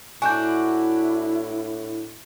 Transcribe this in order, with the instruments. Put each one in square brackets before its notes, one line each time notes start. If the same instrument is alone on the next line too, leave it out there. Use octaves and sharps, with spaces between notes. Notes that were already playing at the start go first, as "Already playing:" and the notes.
[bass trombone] A2 [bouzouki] D4 F#4 [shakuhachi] E4 [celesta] G#5 G6